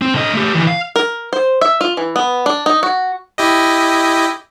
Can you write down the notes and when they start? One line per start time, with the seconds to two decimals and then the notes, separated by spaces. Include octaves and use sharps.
0.02 C4
0.15 D3 D#5
0.34 A3 G4
0.54 D#3 E3
0.67 F5
0.96 A#4
1.33 C5
1.61 E5
1.81 F4
1.97 E3
2.16 B3
2.46 D4
2.66 D#4
2.83 F#4
3.38 E4 G4 D#5